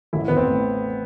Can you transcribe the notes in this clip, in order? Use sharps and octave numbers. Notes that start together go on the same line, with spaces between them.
A1 E4
A1 B3
C4
A2